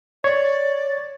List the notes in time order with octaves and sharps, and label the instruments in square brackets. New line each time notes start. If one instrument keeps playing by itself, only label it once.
[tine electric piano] C#5 [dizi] D5